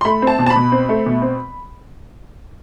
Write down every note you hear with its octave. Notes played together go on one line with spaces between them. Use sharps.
C6
A3 B5
C4
A5
B2
A5
B5
B2
C4
A3
B2
C4